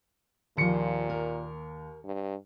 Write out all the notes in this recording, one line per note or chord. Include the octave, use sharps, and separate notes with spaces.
D#2 A#2 F3 C5 C#7
A#4
G2